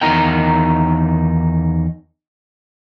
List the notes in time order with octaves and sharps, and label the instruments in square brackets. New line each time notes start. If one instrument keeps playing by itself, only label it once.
[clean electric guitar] E2 D#3 D#4 F#4 A#4 G5